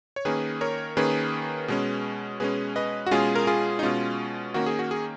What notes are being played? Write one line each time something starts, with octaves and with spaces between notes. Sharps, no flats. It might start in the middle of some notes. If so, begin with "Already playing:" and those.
C#5
D#3 A#3 C#4 G#4 B4
A#4 C#5
D#3 A#3 C#4 G#4 B4
B2 G#3 C#4
B2 G#3 C#4 G#4 B4
B4 D#5
F#4
B2 G#3 C#4 F4 G#4
A#4
F4 G#4
D#4
B2 G#3 C#4 F4
D#3 A#3 C#4 F#4
G#4
F#4
G#4